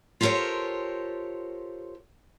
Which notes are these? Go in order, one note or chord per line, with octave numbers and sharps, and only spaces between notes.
F4 G4 A4 A#4 C5 C#5